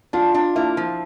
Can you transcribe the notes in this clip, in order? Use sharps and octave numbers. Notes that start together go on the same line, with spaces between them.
D4 F4
D4
A#3 E4
F3